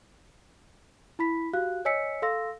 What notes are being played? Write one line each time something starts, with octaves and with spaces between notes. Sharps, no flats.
E4 B5 B6
F#4 G4 F5 F#6
C#5 D#5 G#5 E6 B6 C#7
A4 F5 C6 E6 A#6